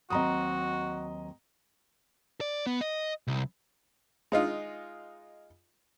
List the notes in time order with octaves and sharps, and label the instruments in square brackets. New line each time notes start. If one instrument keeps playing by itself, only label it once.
[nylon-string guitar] D#2 F#3 C4 [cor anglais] F#4 [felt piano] D#5 A#5 D#6
[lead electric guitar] D5
B3
D#5
C2
[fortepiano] G#3 D#4 F4